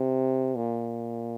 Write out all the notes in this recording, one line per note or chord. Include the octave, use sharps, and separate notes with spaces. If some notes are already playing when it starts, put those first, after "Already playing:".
Already playing: C3
A#2